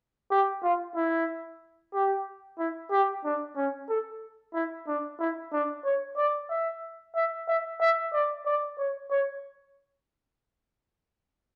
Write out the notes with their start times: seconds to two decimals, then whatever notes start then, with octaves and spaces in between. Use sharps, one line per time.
0.31 G4
0.63 F4
0.96 E4
1.94 G4
2.59 E4
2.91 G4
3.24 D4
3.56 C#4
3.89 A4
4.54 E4
4.87 D4
5.20 E4
5.53 D4
5.85 C#5
6.17 D5
6.50 E5
7.15 E5
7.48 E5
7.81 E5
8.13 D5
8.46 D5
8.78 C#5
9.11 C#5